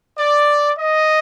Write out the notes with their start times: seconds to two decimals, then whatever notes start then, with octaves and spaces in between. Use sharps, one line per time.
0.17 D5
0.77 D#5